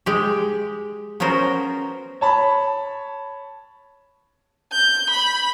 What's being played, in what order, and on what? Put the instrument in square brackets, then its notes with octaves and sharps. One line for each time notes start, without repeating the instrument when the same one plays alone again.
[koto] G#3 G4
B3 C#4 F#4 A#4 C5
[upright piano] C#5 A5 B5
[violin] G6
B5